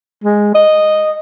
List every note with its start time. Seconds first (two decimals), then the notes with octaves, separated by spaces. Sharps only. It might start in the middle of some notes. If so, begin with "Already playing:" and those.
0.24 G#3
0.55 D#5